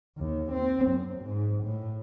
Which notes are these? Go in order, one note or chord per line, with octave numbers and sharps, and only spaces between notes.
D#2
C4
F#2
G#2
A2